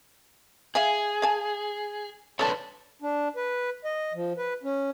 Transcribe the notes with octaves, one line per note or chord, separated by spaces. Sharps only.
G#4 E5 F5 G#5
F5 G#5 A5
D4 A4 B4 C#5 D5 A5
D4
B4
D#5
F3
B4
C#4